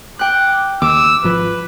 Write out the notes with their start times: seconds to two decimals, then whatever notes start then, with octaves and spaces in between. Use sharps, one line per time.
0.19 G5 D6 F#6
0.82 D#2 D6 E6
1.24 G#1 F3 B4